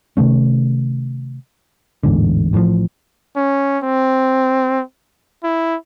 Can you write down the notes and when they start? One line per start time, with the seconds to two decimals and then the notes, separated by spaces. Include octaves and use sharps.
0.17 C3 D#3 A3 C#4
2.03 A1 E2 G#2 D3
2.53 A1 A2 C#3 F3
3.36 C#4
3.83 C4
5.44 E4